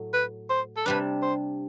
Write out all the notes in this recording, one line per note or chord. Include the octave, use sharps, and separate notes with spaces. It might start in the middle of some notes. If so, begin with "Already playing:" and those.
Already playing: A2 F#3
B4
C5
A4
C3 G3 D4 B4
C5